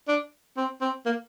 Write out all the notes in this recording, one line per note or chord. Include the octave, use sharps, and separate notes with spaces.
D4
C4
C4
A#3